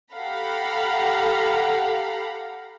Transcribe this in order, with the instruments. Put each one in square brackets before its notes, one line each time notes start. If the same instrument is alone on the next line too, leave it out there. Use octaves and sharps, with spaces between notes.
[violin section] G4 A4 F5 F#5 A#5 B5